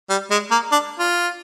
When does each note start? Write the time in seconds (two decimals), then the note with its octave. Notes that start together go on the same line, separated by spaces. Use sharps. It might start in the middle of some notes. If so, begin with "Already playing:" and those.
0.10 G3
0.31 G#3
0.51 A#3
0.72 D4
0.99 F4